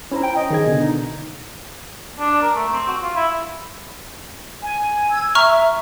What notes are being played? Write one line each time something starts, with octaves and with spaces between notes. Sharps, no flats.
C#4 E4 C5 A#5
G5
D#5
D#3 G#4 G#6
B2 D3
D#4
D4
A#4
A3
C4
F#4
F4
E4
G#5
E6 G#6
E5 A#5 C#6 F6